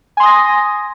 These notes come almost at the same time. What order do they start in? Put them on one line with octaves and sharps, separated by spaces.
G#5 C6 D#6 A#6